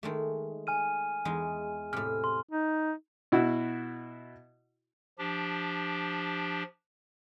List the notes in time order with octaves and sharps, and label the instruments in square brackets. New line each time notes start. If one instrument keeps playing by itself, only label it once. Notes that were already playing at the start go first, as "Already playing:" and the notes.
[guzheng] D#3 G#3 A3
[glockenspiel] G#5 F6 D#7
[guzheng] E2 G#3 D#4 [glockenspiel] G#5
[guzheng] A2 C3 [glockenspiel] F6
[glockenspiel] C6
[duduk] D#4
[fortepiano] B2 E4 F#4
[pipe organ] F3 D4 G4